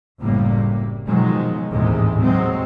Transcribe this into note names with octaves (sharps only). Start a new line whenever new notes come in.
F#1 A2 C3 G3 A#3
B2 D#3 F3 F#3 G#3
A1 D#2 G#2 C3 E3 G#3
C3 F#3 G#3 C4